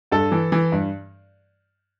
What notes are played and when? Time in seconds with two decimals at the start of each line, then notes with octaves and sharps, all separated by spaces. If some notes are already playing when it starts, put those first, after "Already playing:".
0.12 G2 A4
0.32 E3
0.52 E3
0.72 G2